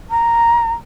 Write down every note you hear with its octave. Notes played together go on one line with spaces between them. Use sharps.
A#5